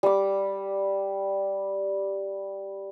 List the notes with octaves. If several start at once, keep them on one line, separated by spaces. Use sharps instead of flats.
G3 D6